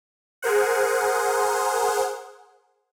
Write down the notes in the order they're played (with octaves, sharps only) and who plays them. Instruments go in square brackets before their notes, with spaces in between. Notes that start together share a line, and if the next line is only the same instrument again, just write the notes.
[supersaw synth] G#4 A#4 C5 F#5